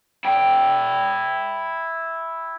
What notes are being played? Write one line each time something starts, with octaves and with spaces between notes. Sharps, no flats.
E4 G5